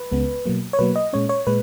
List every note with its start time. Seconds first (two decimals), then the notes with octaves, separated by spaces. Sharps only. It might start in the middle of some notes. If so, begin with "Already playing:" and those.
Already playing: B4
0.11 C#2 C#3 G#3 B3
0.46 B2 F#3 A#3
0.73 C#5
0.79 B2 F#3 A#3 B4
0.96 D#5
1.13 A#2 G#3 C#4 C#5
1.29 C#5
1.47 A#2 G#3 B4